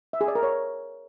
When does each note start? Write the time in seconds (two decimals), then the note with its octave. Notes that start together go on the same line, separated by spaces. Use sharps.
0.13 E5
0.21 G#4
0.28 D5
0.35 A#4
0.43 C#5